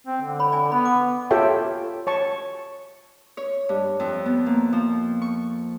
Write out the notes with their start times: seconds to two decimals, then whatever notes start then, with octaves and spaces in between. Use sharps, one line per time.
0.07 C4
0.21 D3
0.39 C#5 B5
0.52 D5 G#5
0.72 B3 B5
0.85 D6
1.31 F4 G4 A4 C#5 E5 G5
2.07 C#5 A5 C#6
3.37 C#5
3.69 G2
4.00 F2
4.26 B3
4.46 A#3
4.73 F3
5.22 C#6